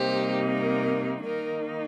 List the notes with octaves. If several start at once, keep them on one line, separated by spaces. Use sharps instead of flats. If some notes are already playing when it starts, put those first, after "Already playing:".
Already playing: C3 G3 A#3 D#4 G4 C5
A#4
D#3 A#3 D#4 A#4